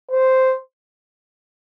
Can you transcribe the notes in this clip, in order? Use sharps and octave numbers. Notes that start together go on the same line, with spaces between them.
C5